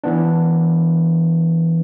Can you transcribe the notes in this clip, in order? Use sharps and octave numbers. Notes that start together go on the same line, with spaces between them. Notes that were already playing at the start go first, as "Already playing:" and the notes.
E3 B3 D4